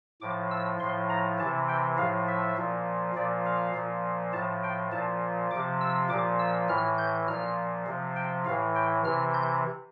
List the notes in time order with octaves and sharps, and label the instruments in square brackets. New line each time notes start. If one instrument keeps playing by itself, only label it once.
[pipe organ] A2 F3 D6
E6
A2 F3 C6
A#5
C3 E3 A5
G5
A2 F3 F5
E5
A#2 F3
A#2 F3 D5
F5
A#2 F3
A2 F3 A5
G5
A#2 F3 A5
C3 F3 D6
E6
A#2 F3 D6
E6
A2 E3 F6
G6
A#2 F3 F6
C3 F3
G5
A2 F5
E3
G5
C3 E3 F6
G6